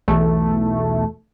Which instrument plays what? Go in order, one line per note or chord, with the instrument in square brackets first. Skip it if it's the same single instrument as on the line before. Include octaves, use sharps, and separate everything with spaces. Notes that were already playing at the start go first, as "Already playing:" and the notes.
[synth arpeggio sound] B1 E2 A3